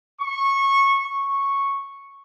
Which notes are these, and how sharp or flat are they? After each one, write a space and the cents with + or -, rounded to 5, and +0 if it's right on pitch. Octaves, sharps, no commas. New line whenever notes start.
C#6 -15
C#6 -5